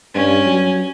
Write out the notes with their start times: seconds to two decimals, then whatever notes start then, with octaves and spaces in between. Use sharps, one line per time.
0.15 G2 C#4
0.46 F#3